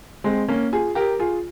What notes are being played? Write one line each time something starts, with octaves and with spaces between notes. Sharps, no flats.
G#3 C4
A#3 C#4
F4 G#4
G4 A#4
F4 G#4